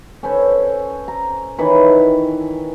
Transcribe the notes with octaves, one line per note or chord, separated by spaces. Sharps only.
C#4 A4 B4 C5
A#5
D#3 E3 B4 C#5